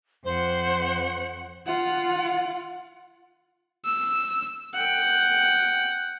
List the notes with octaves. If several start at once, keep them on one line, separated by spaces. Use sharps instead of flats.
F2 C5 F#5
F4 F#5
E6
F#5 G5